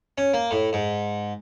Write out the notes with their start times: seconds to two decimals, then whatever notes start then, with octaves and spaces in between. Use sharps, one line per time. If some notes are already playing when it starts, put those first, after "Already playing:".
0.18 C#4
0.34 A#3
0.51 A2
0.73 G#2